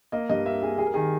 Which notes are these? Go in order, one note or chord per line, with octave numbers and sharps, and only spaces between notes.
A#3 D#5
G2 D#5
A#3 E5
A#3 G#4
G3 G#4
A#4
D#3 G#4